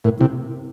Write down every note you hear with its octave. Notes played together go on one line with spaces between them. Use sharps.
A2 A#4
C3 E4